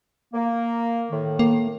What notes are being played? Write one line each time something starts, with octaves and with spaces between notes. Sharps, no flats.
A#3
A2 D#3
A#3